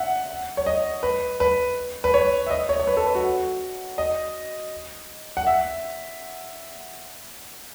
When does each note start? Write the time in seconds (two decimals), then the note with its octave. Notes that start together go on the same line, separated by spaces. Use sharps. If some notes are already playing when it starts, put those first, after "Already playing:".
Already playing: E5 F#5
0.57 C#5
0.66 D#5
1.03 B4
1.40 B4
2.04 B4
2.14 C#5
2.46 E5
2.50 D#5
2.69 C#5
2.80 C#5
2.87 B4
2.97 A4
3.06 B4
3.15 F#4
3.98 D#5
5.37 F#5
5.47 E5